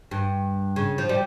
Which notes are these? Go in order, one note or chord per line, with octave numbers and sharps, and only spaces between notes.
G2
C#3
F3
G3